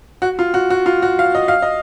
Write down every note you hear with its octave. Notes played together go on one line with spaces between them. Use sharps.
F#4
F4
F#4
F#4
F4
F#4
F5
D#5
F5
D#5